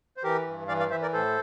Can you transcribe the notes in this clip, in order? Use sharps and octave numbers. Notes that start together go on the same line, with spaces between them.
C5
E3 G4 A#4
G2
E3 D5 F5
D5 F5
E3 C5 E5
A#4 D5
A2 A4 C5